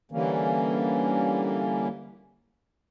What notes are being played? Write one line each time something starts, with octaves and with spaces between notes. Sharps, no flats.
D3 E3 G3 A#3 C#4